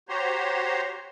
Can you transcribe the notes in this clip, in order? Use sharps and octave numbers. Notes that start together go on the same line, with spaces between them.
F#4 G4 C5 C#5 A#5 C6